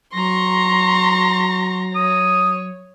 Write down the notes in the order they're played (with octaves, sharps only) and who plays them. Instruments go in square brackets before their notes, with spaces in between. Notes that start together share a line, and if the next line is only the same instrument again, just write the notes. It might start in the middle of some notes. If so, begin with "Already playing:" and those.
[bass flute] F#3 [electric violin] A#5 A#6 [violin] C6 C#6
[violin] C#5 [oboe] D#6